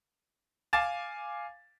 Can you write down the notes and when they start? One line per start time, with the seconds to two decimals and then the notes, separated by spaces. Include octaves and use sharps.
0.73 F5 G#5 D6 A6 E7